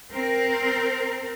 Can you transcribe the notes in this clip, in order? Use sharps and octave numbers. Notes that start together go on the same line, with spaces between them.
C4 A#4